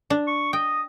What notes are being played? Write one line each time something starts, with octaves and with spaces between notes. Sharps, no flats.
D4
C#6
D#5 G5